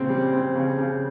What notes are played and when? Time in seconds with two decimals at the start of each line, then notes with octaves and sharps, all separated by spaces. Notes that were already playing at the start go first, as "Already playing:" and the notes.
Already playing: A#2 C#3 C4
0.09 G3
0.33 C4
0.55 C#3
0.78 C#3